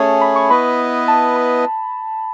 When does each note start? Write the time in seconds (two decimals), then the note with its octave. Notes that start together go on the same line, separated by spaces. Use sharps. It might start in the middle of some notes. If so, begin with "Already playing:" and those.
Already playing: A3 C#4 G#4 C#5 A5
0.21 B5
0.36 C#6
0.50 B3 E4 B4 D#5 B5
1.08 A5
1.37 B5